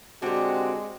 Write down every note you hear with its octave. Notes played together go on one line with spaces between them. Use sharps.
D3 G#3 C4 F#4 G4